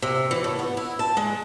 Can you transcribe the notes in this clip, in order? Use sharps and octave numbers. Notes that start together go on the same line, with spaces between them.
C3
E3
A2
B3
E4
A5
G#3